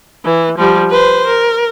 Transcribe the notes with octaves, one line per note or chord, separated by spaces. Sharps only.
E3
F3 G3
B4 C5
A#4